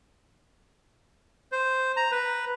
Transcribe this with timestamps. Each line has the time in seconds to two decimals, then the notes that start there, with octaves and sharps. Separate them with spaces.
1.52 C5
1.97 A#5
2.12 B4